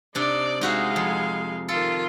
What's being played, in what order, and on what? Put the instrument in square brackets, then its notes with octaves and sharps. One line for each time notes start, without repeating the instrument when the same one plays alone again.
[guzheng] C3 D4 [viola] D#4 D5
[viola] G#3 F5 [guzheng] D#4 F#4 E5
[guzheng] F2
[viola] D#3 F4 [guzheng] A4